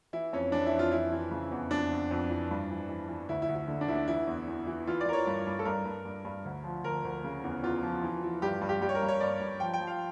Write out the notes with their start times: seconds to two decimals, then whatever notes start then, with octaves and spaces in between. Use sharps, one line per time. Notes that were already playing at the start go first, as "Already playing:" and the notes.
0.13 E3 E4
0.33 F2 C#4
0.52 E3 D4
0.66 E4
0.73 F2
0.79 F4
0.92 E3 E4
1.12 E3
1.31 C#3
1.51 E2
1.71 F2 D4
1.91 F2
2.11 F2
2.30 E3
2.51 G2
2.70 E3
2.89 E3
3.09 E3
3.29 D2 E4
3.42 E4
3.49 D2
3.55 E4
3.68 D3
3.81 D4
3.88 D2 E4
3.95 D4
4.08 E3 E4
4.27 E2
4.48 E2
4.67 E3
4.87 E3 F4
5.01 D5
5.06 E3 A#4
5.13 C#5
5.27 G2
5.46 G2
5.59 A4
5.65 G2 A#4
5.85 G2
6.05 G2
6.25 G2
6.45 D2
6.64 F3
6.84 D2 A#4
7.04 D2
7.24 C#3
7.44 E2
7.63 E2 F4
7.83 F3
8.03 E3
8.23 E3
8.42 G2 G4
8.61 G2
8.69 G4
8.81 G2 G4
8.89 C#5
8.95 A#4
9.02 G2
9.08 C#5
9.20 G2 D5
9.40 G2
9.60 F3 G5
9.73 G5
9.80 F3
9.87 F5